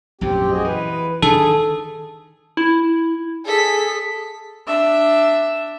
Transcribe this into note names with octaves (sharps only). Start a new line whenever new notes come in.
A#1 F#2 A2 C4 G4
F#4 G#4 D#5
E3 B4
D#3 D4 G#4 A4
E4
G#4 A4 B6
D4 E5